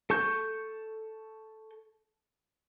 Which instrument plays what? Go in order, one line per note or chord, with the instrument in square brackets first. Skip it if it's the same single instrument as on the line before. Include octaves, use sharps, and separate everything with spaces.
[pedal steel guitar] A4 A5 C#6 G6